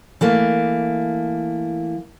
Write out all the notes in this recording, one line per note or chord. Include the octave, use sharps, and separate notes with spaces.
E3 A3 A#3